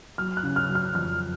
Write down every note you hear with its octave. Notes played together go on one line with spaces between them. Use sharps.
F#3 F6
F#6
C#3
F6
F#3
F6
F2 F6